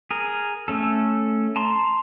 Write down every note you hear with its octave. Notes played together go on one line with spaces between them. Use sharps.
G#4 A#4
A3 C#4 A4
A5 A#5 C6